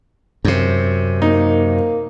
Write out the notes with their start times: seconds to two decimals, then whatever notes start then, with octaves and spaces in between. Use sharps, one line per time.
0.45 F#2 C3
1.22 A#3 D#4